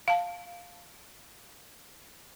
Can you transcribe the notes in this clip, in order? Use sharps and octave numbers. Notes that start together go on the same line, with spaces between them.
F5 A5